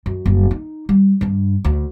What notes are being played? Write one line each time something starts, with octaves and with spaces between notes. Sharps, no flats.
F#2
F#1 G2
D#4
G3
G2 D4
D2